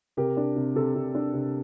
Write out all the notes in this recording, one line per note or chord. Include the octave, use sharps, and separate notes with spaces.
C3 G4 A#4
D4
C3
C3 A4
C3
D4
C3